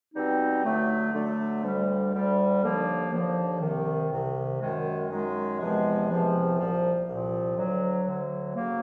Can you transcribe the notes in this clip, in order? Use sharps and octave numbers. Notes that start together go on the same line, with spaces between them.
B2 G3 C4 D#4
D3 F#3 A3
D3 F#3 A3
D2 D3 G3
D2 D3 G3
D#2 D3 F3 A#3
D#2 D3 F3 A#3
C2 C3 D#3
C2 C3 D#3
F#2 D#3 G#3
F#2 D#3 G#3
E2 C3 F3 G#3
E2 C3 F3 G#3
C2 A#2 F3
C2 A#2 F3
D2 D3 F#3
D2 D3 F#3
C#3 F#3 A#3